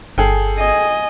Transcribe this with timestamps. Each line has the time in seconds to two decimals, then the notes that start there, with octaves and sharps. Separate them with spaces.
0.18 G1 G#4 A4 G5
0.59 D#5 G#5